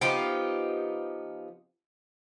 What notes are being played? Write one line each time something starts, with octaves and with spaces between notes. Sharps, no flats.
F3 B3 D#4 G4